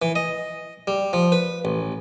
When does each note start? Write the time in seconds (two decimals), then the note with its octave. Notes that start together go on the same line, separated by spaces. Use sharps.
0.02 E3
0.16 D#5
0.87 G3
1.13 F3
1.32 B4
1.65 A1